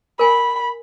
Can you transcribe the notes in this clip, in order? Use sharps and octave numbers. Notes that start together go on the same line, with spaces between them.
A#4 G#5 B5